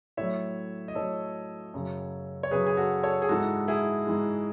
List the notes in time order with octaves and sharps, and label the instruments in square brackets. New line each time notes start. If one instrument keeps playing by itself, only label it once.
[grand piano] A2 F#3 C#5 E5
D#5
A2 F#3 A4 C#5
F#2 C#3 F#3
C#5
F#2 C#3 F#3 G#4 B4
G#4
F#4 A4
A4 C#5
G#4
G#2 E3 G#3 F#4 A4
E4 G#4
G#2 E3 G#3